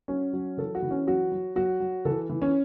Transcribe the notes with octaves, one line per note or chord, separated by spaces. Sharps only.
F#3 C#4
F#3
E3 A4
F#4
E3
C#4
F#3 F#4
F#3
F#3 F#4
F#3
E3 A4
E3
C#4